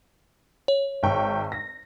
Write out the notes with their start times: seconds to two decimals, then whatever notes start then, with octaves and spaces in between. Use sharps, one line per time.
0.68 C#5
1.03 G#1 G5 C#6
1.52 A#6